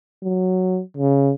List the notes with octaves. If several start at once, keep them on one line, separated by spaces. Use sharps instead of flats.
F#3
C#3